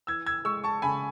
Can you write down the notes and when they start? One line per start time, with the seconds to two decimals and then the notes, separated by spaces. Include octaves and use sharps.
0.07 E3 E6 G#6
0.26 E6 G#6
0.45 G#3 C#6 E6
0.64 A5 C#6
0.82 C#3 G#5 B5